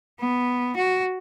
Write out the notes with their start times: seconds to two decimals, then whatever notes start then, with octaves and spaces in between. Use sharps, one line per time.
0.20 B3
0.76 F#4